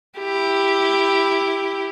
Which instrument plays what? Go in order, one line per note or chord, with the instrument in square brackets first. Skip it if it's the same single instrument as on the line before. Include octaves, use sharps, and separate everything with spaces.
[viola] E4 G4